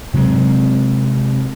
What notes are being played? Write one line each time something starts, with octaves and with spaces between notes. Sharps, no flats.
C3 F#3 G#3 C4